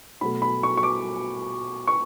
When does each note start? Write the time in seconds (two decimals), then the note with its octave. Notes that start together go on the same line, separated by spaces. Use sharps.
0.21 B2 F#3 A3 B5
0.42 B5
0.63 C#6
0.77 C#6
0.83 D6
1.87 C#6